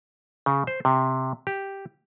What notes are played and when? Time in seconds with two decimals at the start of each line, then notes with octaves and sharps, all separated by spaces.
0.46 C#3
0.67 C5
0.85 C3
1.47 G4